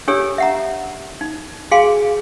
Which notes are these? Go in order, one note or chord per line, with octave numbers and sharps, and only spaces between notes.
D4 G4 A4 C#5 E6
E5 F#5 A#5
D#4
F#4 G#4 F5 G#5 C6